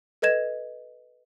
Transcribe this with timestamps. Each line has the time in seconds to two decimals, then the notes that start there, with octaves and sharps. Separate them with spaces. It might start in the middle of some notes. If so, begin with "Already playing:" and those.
0.22 A4 B4 D#5 G#6 E7